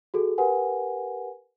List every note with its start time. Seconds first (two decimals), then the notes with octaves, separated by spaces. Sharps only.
0.14 F#4 G#4 A4
0.38 G4 A#4 B4 F#5 G#5